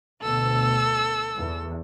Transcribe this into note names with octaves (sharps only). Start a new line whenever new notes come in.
D2 B2 A4 E6
E2